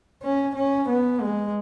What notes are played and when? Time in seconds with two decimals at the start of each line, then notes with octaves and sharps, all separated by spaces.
0.23 C#4
0.56 C#4
0.89 B3
1.21 G#3